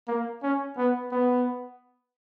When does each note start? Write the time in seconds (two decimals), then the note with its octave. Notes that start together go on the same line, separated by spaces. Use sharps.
0.08 A#3
0.43 C#4
0.78 B3
1.12 B3